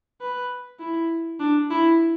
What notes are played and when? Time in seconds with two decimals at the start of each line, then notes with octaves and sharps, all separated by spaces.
0.21 B4
0.80 E4
1.40 D4
1.71 E4